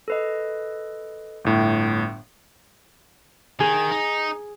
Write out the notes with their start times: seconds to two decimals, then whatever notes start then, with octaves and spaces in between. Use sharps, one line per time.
0.08 A4 B4 D#5
1.44 G1 A2
3.60 D#3 G#4
3.91 D#4